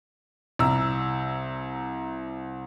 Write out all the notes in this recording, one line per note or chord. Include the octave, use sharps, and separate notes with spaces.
C2 A#5 E6